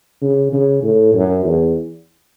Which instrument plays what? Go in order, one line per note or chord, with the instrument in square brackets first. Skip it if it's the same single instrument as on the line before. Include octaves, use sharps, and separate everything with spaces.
[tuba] C#3
C#3
A2
F#2
E2